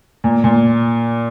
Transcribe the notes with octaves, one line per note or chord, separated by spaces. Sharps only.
A#2
A#2